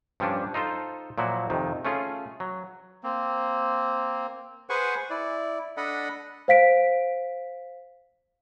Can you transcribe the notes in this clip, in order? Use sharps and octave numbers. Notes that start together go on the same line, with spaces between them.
G2 F3 G3 C#4 D4
D#4 F4 A4 C5
A#2 F3 F#3 E4 F#4
F2 C3 D#3
A3 C#4 F4 G#4
F#3
A#3 C4
G#4 B4 C5 F#5 G#5 C#6
E4 D5
D4 A4 D#5 F#5 B5
C5 F5 B6 D7